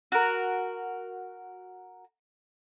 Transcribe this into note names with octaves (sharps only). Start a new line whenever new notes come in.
F#4 A#4